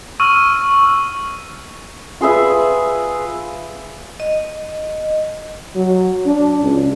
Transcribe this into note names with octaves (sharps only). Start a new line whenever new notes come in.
C#6 E6 F6 D#7
F4 G#4 B4 E5
D#5
F#3
D4
C#2